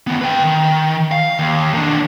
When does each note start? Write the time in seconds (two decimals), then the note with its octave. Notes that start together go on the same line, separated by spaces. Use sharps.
0.07 D#3 B3
0.21 B4 G5
0.43 D#3
1.12 F5
1.39 D#2
1.74 D#3 D4